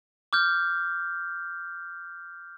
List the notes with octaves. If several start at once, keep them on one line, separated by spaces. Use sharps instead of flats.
D6 F6 G6